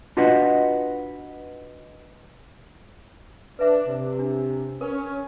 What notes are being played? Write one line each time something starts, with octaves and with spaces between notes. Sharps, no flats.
D4 F4 F#4 B4 D#5 F#5
D4 B4 E5
C3
D4
C#4 A#4